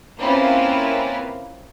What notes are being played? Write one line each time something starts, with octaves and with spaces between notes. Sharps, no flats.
A#3 C4 C#4 E4 F4 B4